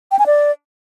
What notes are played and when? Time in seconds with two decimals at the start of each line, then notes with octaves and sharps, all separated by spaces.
0.11 G5
0.19 G#5
0.26 D5